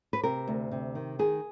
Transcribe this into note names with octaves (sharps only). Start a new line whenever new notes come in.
B4
C3 A#4
D2
C3
D#3
D#3 G#4